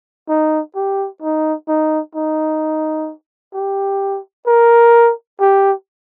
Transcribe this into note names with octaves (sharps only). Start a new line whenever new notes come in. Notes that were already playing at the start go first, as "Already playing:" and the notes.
D#4
G4
D#4
D#4
D#4
G4
A#4
G4